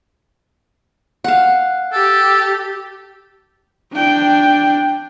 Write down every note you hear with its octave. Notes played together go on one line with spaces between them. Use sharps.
F5 F#5
G4 A4
D4 G5